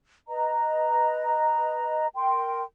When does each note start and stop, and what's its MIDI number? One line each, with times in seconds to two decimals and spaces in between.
0.28 2.07 71
0.28 2.07 75
0.28 2.07 82
2.15 2.62 70
2.15 2.62 79
2.15 2.62 84